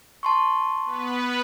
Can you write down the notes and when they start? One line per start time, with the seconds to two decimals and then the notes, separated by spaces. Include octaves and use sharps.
0.23 A5 C6 C#6
0.85 B3 B4